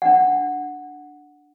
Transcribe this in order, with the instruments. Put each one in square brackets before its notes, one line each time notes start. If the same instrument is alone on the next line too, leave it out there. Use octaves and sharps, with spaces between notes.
[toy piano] D4 F#5